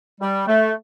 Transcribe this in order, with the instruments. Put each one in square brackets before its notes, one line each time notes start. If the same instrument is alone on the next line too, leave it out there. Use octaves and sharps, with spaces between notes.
[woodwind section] G3
A3